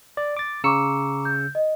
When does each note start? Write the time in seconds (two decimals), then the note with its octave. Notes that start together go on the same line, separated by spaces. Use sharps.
0.17 D5
0.37 D6 A6
0.64 C#3 A#5 C#6 D6 E6 C#7
1.25 G6
1.55 D#5